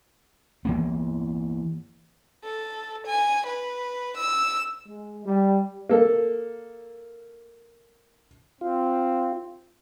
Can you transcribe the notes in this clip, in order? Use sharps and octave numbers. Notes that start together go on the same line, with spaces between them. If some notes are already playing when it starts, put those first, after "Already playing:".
E3 A#3 B3
A4
G#5
B4
E6
G#3
G3
A#3 A4
C4 F4